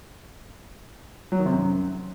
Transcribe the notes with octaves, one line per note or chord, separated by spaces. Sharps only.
F#3
D#3
C3
F#2